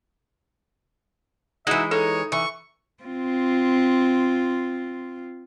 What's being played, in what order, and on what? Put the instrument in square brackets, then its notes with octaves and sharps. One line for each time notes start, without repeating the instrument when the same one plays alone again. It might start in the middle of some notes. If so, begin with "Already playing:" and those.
[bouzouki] E3 G#3 [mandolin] D#4 E4 F#4 [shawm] E5
[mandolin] D#4 [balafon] A4 [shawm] C#5
[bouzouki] E3 [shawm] C#6
[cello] C4 F4